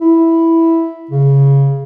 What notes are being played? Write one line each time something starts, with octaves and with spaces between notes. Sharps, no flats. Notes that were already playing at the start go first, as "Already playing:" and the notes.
E4
C#3